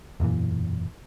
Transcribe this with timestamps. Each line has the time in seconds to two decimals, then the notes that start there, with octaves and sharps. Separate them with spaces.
0.20 E1 F#2 A#2 E3